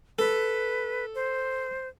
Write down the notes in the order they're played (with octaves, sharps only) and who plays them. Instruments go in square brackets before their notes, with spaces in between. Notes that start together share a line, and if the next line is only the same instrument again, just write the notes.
[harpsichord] A4 [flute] B4
[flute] C5